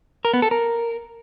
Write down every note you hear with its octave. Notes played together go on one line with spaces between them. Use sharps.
A#4
B3
A4
A#4